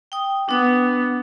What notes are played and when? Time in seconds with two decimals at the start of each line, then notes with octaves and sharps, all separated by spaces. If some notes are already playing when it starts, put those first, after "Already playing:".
0.12 G5 D#6
0.49 B3 D4 D#6